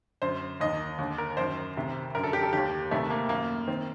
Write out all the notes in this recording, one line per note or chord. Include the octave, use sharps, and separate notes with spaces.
F#2 D3 C5
D#2 D#3 D#5
D#2 D3
A#4
F#2 D#3 C5
D2 C3 D#3
F#2 D3 A#4
A4
G4
A4
D#2 D#3 G4
D2 C3 D#3 A3
A#3
F#2 D#3 A#3
D#3 C4